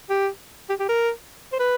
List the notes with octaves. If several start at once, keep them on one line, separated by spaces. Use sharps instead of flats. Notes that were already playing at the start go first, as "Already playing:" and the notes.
G4
G4
G4
A#4
C5
B4